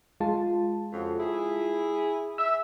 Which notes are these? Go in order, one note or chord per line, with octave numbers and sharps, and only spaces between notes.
G#3 F4 A5
F2 C#3 F#4
E4 G#4
E5 E6